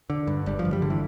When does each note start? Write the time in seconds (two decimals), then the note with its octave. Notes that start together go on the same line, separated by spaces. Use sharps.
0.10 D3
0.27 G2
0.46 G1 G3
0.59 F3
0.65 G1
0.73 G3
0.82 D3
0.90 E3